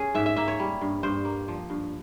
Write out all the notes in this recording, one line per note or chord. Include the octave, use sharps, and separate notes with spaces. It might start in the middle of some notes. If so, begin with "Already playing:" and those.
Already playing: C#4 G#4
G#2 E5
E5
A#3 E5
C#5
G3
G2
G2 C5
A#3
F3
G2